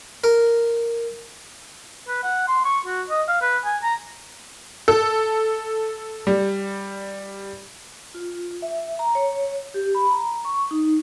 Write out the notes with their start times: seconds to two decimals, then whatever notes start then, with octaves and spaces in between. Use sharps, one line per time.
0.24 A#4
2.08 B4
2.23 F#5
2.48 C6
2.65 C#6
2.86 F#4
3.10 D#5
3.28 F5
3.42 B4
3.65 G#5
3.83 A#5
4.88 A4
6.27 G3
8.14 F4
8.62 E5
8.99 A#5
9.15 C#5
9.74 G4
9.95 B5
10.11 A#5
10.45 C#6
10.71 D#4